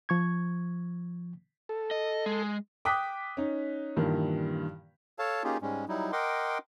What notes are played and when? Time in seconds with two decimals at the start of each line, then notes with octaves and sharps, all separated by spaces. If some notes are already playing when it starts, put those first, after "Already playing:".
0.09 F3 C#6 G#6
1.69 A4
1.91 D#5
2.26 G#3
2.85 G5 D6 D#6 F#6 B6
3.37 C#4 D#4
3.97 G2 A#2 D#3 E3
5.19 A4 C#5 F5 A5
5.44 A#3 C#4 D#4 F4 G4 G#4
5.62 G#2 G3 G#3 C#4
5.88 F#3 G3 D#4 E4
6.12 A#4 D#5 F#5 G5 C6 D6